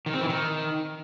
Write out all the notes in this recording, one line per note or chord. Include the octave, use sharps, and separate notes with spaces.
D#3
C4
E3
D#3